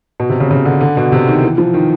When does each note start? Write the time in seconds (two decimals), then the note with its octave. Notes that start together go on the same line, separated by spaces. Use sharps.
0.20 B2
0.30 C3
0.40 C#3
0.51 C#3
0.65 D3
0.81 D3
0.97 B2
1.12 C3
1.28 D#3
1.43 E3
1.58 F3
1.74 D#3